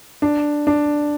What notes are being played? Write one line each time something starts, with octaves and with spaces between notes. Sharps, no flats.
D4
D4